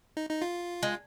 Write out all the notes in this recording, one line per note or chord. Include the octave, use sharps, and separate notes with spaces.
D#4
D#4
F4
G#3